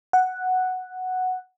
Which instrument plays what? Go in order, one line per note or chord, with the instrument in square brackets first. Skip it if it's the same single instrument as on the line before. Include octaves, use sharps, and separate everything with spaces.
[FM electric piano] F#5